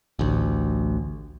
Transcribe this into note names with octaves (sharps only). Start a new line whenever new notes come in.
A1 D2